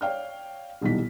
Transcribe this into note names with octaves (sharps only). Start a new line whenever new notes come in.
C#5 D5 F5 G5 F6
D#1 B1 E3 G3 D#4 B6